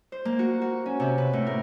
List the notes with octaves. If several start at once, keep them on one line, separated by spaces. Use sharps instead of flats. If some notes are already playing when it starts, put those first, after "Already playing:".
C5
A#3
F#4
F#4
C#4
C3
B4
A2
A#4